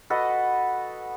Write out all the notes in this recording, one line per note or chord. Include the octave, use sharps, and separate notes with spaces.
F#4 A4 B4 D#5